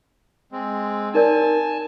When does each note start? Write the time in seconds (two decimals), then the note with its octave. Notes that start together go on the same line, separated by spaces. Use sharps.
0.52 G#3 C4
1.14 D#4 A#4 D5 G#5 A5